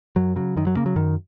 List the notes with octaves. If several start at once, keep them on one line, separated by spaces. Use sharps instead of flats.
F#2 F#3
C#3 F#3
F#2 D#3
F#3
C#3 A#3
F#3
F#2 D#3